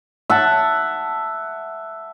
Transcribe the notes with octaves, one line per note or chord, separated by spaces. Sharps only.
E5 F#5 A5